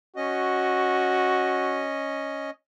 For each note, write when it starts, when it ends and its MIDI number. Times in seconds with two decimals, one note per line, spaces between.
0.16 2.50 61
0.16 1.89 66
0.16 2.50 75